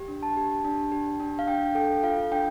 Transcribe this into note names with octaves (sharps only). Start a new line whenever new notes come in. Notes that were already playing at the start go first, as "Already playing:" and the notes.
Already playing: G4
D4
A5
G4
D4
G4
D4
F5
D4 G5
A4 G5
F4 F5
D4 G5